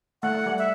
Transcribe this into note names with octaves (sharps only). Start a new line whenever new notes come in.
A3 F#5
A3
G3
E5